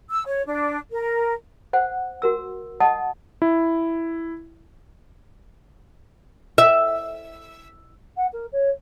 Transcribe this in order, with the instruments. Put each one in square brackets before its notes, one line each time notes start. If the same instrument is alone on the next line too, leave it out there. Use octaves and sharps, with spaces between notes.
[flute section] E6
C#5
D4
A#4
[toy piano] C5 F#5
F#4 A#4 E6
D#5 F#5 A5 D#6
[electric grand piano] E4
[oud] E5
[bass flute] F#5
A#4
C#5